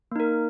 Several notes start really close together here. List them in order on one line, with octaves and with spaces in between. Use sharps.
A#3 D#4 A#4